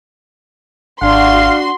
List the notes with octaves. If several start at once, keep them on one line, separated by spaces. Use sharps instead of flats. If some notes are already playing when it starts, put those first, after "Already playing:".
G#1 D4 F#4 F5 C6